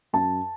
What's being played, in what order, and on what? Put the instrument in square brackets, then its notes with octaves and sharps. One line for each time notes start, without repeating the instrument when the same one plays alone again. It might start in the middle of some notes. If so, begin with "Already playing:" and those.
[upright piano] F#2 A5